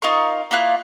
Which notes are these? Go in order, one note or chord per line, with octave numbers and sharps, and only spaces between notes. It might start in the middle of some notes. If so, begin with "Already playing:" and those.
D#4 F4 A#4 C#6
A#3 E4 F4 F#6